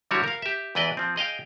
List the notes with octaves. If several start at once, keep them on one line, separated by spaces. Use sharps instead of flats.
D3 F#3 G3 E4 F#4 C#5
A#4 F5
G4 E5
E2 E3 B4 D5 D#5
F3 C4
G#4 D#5 F5 G5